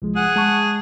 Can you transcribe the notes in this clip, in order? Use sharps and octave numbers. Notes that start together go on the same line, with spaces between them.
C2 F3 G#3
G#4 F#5
G#3 A5 C#6